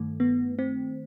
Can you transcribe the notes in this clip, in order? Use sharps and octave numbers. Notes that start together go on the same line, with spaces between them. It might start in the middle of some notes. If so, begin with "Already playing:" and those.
Already playing: G2 D#3 A3
B3
C4